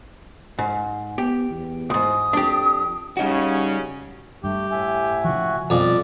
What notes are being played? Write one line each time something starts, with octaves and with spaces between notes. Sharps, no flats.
G#2
B3 G4
E2
C2 G#2 D#6
F2 D4 G4
C#3 G3 C#4 D#4 F#4
G2 A3 G4
A2 E5 G#5
C#3 F3 F#4
F2 B2 F3 G3 D5